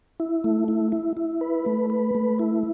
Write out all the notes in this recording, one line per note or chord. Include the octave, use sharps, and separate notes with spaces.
E4
A3
E4
E4
E4
B4
A3
B4
A3
E4